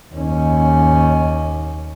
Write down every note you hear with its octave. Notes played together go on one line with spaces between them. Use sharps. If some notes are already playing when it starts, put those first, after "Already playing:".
D#2 C#4